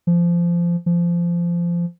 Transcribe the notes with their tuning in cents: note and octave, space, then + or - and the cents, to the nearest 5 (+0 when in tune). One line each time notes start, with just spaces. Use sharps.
F3 -20
F3 -20